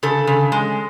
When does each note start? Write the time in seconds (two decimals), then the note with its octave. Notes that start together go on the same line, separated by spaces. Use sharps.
0.03 C#3 A4
0.27 C#3
0.52 G#3